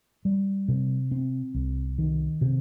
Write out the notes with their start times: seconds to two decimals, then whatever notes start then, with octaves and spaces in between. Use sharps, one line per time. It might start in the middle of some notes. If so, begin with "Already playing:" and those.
0.25 G3
0.68 C3
1.11 C4
1.54 C2
1.98 D#3
2.41 C3